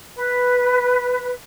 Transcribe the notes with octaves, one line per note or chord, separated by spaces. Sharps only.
B4